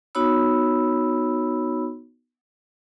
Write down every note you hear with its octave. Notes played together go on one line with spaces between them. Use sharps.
B3 D#4 F#4 C#5 B5 E6